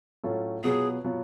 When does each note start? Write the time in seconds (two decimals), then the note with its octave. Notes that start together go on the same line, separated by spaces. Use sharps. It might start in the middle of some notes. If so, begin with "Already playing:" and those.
0.24 A2 F#3 C#4 F4 A4
0.64 B2 F#3 B3 F4 G#4
1.04 B2 F#3 B3 F4